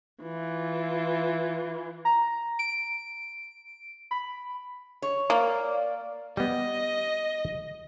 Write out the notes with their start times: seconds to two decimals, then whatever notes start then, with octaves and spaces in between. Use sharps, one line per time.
0.23 E3 F4
2.05 A#5
2.59 D7
4.11 B5
5.02 C#5
5.30 A#3 D5
6.37 G3 B3 D#5